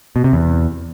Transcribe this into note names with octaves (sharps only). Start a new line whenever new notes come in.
B2
C3
E2